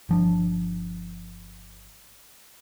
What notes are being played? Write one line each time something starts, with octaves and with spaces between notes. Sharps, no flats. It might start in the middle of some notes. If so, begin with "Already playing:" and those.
G1 F3 D4